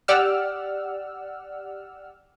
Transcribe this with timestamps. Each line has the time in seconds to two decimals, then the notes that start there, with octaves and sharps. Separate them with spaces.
0.08 G4 D5 F#5 E6 F6